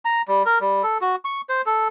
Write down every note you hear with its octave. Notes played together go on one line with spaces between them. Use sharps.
A#5
G3
A#4
G3
A4
F#4
C#6
C5
A4